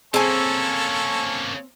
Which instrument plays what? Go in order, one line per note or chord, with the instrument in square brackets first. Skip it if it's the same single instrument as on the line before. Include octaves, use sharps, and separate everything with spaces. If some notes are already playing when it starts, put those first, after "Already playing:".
[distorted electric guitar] A#3 C#4 [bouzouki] C4 G#5 [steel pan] G#4 A5 [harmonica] A4 C#5